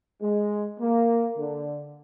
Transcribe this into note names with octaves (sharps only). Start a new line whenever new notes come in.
G#3
A#3
D3